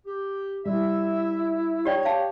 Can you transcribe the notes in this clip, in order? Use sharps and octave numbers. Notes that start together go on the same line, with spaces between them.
G4
G3 E4 E5
D#4 G4 C#5 D5 G5
G4 F5 A5